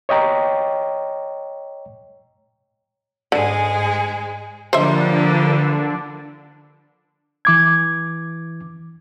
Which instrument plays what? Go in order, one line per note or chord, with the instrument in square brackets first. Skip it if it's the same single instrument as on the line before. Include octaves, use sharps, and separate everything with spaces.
[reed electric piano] C#5 D#5 G5 A#5
[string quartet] G#2 G#3 G#4 [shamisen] D3
[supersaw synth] D3 D4 [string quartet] F3 G3 A#3 [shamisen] C5 D#5 E5
[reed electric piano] E3 D6 G#6